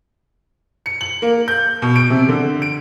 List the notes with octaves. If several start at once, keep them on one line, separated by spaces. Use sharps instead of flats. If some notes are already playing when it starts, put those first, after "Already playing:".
C#7
F#7
A#3
G6
B2
D7
C3
D3
D7